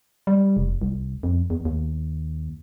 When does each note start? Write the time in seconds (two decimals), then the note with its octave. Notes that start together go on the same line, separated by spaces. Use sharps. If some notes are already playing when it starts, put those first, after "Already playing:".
0.27 G3
0.57 F1
0.82 C2
1.23 F2
1.50 E2
1.65 D#2